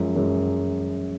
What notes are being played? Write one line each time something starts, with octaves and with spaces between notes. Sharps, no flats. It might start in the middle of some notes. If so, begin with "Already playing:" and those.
Already playing: F#2 F3 G#3
F#2 F3 G#3